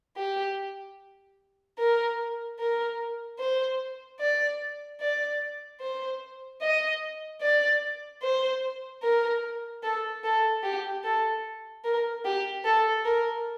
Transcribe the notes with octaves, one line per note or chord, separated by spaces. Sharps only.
G4
A#4
A#4
C5
D5
D5
C5
D#5
D5
C5
A#4
A4
A4
G4
A4
A#4
G4
A4
A#4